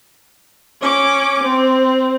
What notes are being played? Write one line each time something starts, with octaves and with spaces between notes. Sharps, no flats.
C#4 D6
C4